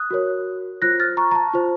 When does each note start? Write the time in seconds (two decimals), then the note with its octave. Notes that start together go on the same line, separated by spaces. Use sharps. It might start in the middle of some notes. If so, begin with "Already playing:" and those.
Already playing: D#6 F#6
0.11 F#4 A#4 C#5
0.82 F4 C5 F#6 A#6
1.00 F6 A6
1.17 A#5 C#6
1.31 A#5
1.35 A5
1.54 F4 C5